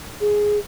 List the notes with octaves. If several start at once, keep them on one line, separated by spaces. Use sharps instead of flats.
G#4